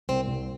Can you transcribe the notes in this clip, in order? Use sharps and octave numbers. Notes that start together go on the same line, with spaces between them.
C2 C4
C2